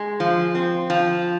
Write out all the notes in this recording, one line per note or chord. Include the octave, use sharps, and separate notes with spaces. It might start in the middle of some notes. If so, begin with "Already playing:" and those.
Already playing: G#3
F3
C4
F3